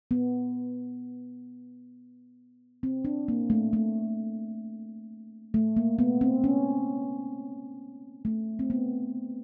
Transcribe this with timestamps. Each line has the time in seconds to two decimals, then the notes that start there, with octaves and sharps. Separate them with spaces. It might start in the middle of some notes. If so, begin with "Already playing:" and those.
0.11 B3
2.83 C4
3.05 D4
3.28 A#3
3.50 A3
3.73 A3
5.54 A3
5.76 A#3
5.99 B3
6.21 C4
6.44 C#4
8.25 A3
8.59 C4
8.70 B3